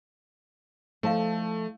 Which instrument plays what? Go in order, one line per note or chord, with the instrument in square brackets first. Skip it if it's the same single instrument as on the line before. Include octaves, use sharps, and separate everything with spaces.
[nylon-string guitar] F3 A4 A5 [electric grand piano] A3 [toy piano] E4 D#5 F5